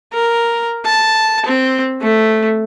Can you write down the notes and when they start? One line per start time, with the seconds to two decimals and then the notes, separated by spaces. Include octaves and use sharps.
0.13 A#4
0.85 A5
1.45 C4
2.01 A3